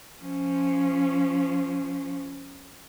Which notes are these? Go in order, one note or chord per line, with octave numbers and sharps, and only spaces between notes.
F3 C#4